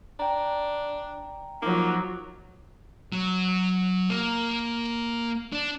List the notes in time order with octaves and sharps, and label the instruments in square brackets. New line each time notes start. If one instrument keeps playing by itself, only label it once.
[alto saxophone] D4 [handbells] G5 A#5
[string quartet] F3 F#3 [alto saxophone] A#3 [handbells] D#4 F4 D6
[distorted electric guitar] F#3
A#3
D4